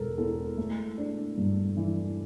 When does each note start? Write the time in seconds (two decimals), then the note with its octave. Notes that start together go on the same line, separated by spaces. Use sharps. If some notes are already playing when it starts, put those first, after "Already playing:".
Already playing: E1 A4 A#4
0.18 E2 A4
0.58 A3
0.98 D4
1.38 G2
1.77 E3